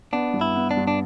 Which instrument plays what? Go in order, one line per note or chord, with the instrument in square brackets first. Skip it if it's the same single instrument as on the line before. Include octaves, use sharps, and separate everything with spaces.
[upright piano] B3 [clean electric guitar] D4
[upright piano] G2
[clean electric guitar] E4
[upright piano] B3
[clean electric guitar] D4
[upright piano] G2
[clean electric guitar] D4